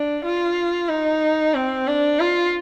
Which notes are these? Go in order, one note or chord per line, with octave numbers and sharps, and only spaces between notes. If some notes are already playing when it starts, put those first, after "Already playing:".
Already playing: D4
F4
D#4
C4
D4
F4